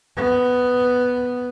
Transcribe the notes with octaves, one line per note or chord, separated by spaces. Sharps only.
B3